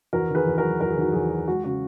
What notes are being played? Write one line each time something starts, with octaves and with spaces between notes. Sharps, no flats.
E2 F#4 A#4
D#3
G#4 B4
E2
F#3 F#4 A#4
E2 A#4
G#4
D#3 F#4
E2 G#4
F#3
G#3 F#4
C#3 F#4